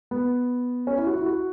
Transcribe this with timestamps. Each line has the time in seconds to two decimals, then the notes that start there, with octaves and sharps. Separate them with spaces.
0.11 B3
0.87 C#4
0.98 E4
1.07 F#4
1.16 E4
1.26 F#4